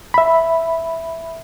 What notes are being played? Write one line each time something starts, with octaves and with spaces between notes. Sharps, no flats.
E5 B5